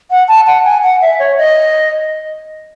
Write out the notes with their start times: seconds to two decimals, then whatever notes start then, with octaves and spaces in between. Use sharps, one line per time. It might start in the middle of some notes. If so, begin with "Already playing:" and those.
0.11 F#5
0.28 A5
0.47 F#5
0.65 G#5
0.84 F#5
1.01 E5
1.19 C#5
1.38 D#5